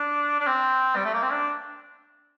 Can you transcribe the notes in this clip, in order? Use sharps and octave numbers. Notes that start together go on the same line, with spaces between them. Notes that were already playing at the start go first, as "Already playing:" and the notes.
Already playing: D4
D4
C4
G3
A3
A#3
C4
D4